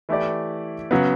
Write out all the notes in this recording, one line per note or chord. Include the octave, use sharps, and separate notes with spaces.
E3 A3 E4 G4 D5
C#3 F#3 B3